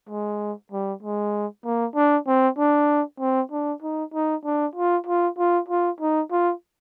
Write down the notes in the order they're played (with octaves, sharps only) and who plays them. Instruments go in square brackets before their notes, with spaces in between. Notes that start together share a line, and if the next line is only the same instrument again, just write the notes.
[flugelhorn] G#3
G3
G#3
A#3
D4
C4
D4
C4
D4
D#4
D#4
D4
F4
F4
F4
F4
D#4
F4